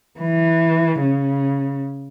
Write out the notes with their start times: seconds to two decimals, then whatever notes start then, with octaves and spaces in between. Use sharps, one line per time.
0.20 E3
1.00 C#3